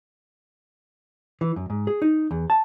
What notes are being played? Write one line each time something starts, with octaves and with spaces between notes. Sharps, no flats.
E3
F#2
G#2
G#4
D#4
E2
A5